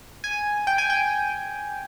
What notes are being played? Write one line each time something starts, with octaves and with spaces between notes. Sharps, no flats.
G#5
G5
G#5
G5